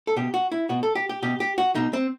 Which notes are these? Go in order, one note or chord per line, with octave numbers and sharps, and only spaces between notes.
A4
B2 G4
F#4
E4
B2 F#4
A4
G4
G4
B2 G4
G4
F#4
B2 D#4
C4